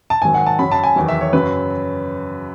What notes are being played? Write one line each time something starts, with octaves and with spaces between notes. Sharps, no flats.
A5
G#2 D#3 F#3 G#5
F#5
A5
F#2 C#3 F#3 C#4 B5
A5
G#5
E2 D#3 F#3
E5
C#5
F#2 C#3 F#3 C#4 B4